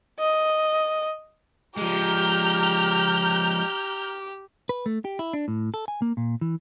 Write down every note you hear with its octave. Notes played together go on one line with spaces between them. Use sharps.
D#5
F3 G#3 G4 A#5 F6 G6
B4
A3
G4
E4
D4
A2
A4
G#5
A#3
A#2
E3